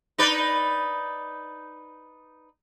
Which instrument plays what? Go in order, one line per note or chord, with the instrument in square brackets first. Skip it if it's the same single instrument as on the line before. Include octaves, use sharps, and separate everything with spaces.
[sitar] D#4 B4 D5